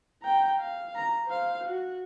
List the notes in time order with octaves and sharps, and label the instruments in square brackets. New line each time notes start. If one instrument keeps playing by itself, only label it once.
[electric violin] G5 A#5
F5
A#5
C5 F5
F#4